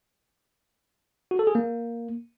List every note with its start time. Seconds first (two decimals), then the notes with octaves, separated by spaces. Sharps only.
1.31 F#4
1.39 A4
1.47 G#4
1.55 A#3